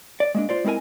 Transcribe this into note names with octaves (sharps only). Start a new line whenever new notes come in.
D5
G#3 A#3 D4
F4 C5 D5
G#3 C4 E4 A#4 G#5